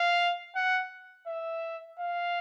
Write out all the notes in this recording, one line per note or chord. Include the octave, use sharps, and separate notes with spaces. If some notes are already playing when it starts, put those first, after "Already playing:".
Already playing: F5
F#5
E5
F5